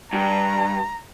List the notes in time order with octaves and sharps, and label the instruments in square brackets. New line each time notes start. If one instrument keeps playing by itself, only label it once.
[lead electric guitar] G2 [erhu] A#5